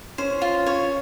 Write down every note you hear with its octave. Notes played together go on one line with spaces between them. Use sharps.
C#4 C5
F4
C#4 C#5